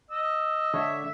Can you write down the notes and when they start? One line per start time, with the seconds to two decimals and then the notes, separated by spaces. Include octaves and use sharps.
0.10 D#5 E6
0.74 D3 C#5 E5